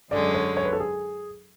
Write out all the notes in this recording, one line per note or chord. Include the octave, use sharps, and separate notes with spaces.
F#2 D3 G#3 C#4 D5
C#5
C#5
B4
A4
G#4